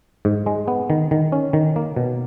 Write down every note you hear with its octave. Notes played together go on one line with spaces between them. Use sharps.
G#2
G#3
B3
D#3
D#3
C#4
D#3
A#3
B2